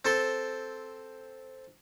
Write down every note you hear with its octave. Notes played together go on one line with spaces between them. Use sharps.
C4 A4 C6